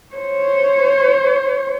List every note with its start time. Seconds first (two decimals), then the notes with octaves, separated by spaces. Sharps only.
0.15 C5 C#5